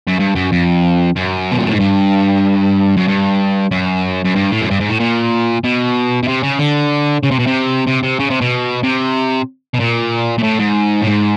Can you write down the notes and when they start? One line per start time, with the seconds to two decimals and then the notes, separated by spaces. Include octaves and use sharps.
0.08 F#2
0.20 G2
0.36 F#2
0.52 F2
1.16 F#2
1.52 B2
1.59 A#2
1.66 A2
1.73 G#2
1.80 G2
2.97 F#2
3.08 G2
3.72 F#2
4.25 F#2
4.36 G2
4.52 A2
4.62 F#2
4.71 G2
4.80 G#2
4.90 A2
5.00 A#2
5.64 B2
6.23 B2
6.28 C3
6.43 C#3
6.59 D3
7.23 C#3
7.31 C3
7.39 B2
7.47 C3
7.87 C3
8.03 C3
8.20 C#3
8.30 C3
8.41 B2
8.83 C3
9.74 B2
9.79 A#2
10.38 A#2
10.43 A2
10.60 G#2
11.02 A2
11.07 G#2